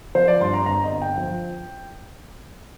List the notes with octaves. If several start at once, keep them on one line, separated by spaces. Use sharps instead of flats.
F3 C5
D5
G2 C6
A#5
G1 A#5
D#5
G1
G5
F3